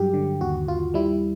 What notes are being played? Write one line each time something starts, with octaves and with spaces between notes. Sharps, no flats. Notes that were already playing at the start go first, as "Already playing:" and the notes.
Already playing: G2 F#3 G4
D3
D#2 F#4
D#2 F4
G3 E4